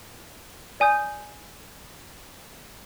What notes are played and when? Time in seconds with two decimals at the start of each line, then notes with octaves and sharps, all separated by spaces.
0.80 D5 G#5 D#6 G6